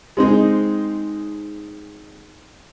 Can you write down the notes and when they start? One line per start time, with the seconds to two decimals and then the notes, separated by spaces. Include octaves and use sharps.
0.17 G#3 C4 D#4